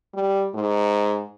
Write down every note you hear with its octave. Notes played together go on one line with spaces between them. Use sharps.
G3
G#2